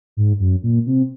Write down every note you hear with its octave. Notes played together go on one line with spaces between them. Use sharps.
G#2
F#2
A#2
C3